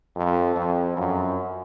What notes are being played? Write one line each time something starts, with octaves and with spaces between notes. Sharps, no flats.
F2
F2
F#2